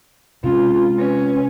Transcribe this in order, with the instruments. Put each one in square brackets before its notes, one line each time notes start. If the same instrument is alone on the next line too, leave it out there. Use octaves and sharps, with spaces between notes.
[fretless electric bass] C3 G#3 [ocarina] C#4 [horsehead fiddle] F4
[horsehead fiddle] C#4 [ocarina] B4